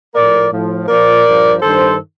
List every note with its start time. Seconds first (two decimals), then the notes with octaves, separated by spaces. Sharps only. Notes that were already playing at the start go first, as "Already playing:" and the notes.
0.15 A2 F3 A#4 D5
0.52 A2 F3
0.88 A#2 F3 A#4 D5
1.26 G2 F3
1.62 G2 D#3 A4 C5